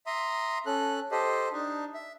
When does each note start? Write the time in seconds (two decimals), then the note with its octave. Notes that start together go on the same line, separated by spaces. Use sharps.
0.06 E5 A#5 C6 D#6
0.66 C#4 A4 F#6
1.11 G4 A4 C5 D#5
1.53 D4 D#4
1.94 E5